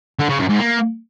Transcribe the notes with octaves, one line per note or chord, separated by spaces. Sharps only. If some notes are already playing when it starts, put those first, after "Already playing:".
D3
C#3
F#2
G#2
A#3